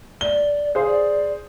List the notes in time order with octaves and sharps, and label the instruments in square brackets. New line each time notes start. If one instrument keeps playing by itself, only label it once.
[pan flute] D5 [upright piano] G7
[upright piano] G#4 C5 [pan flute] F5
[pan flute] D5